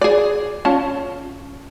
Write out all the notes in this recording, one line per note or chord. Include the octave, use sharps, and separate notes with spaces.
G#4 D5
C#4 F4 A5